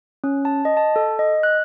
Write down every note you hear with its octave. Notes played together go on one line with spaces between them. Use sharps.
C#4
A5
D#5
A5
A4
D#5
F#6